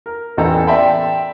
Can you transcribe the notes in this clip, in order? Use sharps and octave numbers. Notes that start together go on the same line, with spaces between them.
A#4
A1 E2 E3 A4 G5 A#5
D5 E5 G5 A5 B5 C6